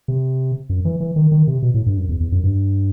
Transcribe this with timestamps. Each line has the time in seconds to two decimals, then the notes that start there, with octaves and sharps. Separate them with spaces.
0.08 C3
0.69 F#2
0.85 E3
1.00 E3
1.16 D#3
1.32 D#3
1.47 C3
1.62 B2
1.74 A2
1.86 G2
1.97 F#2
2.09 E2
2.20 E2
2.32 F#2
2.44 G2